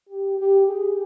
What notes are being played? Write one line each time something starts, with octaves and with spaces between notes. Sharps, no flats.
G4
G4
G#4